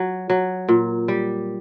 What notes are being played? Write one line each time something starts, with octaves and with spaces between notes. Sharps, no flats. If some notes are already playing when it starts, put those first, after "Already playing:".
Already playing: F#3
F#3
A#2
G3